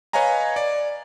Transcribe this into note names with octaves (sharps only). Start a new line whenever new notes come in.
B4 C#5 D#5 F5 G#5 A#5
D5